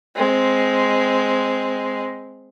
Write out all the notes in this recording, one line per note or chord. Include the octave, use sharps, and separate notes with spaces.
G#3 C4